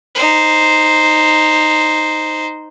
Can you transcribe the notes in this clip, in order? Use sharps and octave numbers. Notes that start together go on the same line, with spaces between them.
D#4 C5